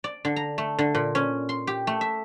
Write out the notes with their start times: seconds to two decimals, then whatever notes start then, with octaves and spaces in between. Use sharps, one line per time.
0.04 D5
0.25 D3
0.36 A#5
0.58 A3
0.79 D3
0.95 A#2
1.15 C#4
1.49 C6
1.67 G4
1.87 A3
2.01 E5